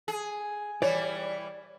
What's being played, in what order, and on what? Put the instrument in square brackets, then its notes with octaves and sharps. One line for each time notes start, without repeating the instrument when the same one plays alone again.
[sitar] G#4
[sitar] E3 G3 [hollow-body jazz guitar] C#5 D5